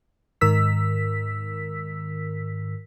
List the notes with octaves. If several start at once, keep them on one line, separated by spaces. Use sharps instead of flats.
G#2 D#3 A#4 E6 B6